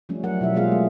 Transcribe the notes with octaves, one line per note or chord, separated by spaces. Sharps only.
F3 G3 A3 C#4
F#3 A#4 F#5
B2 E4 G4 E5
G#3 A#3 F4 G#4 F5
A3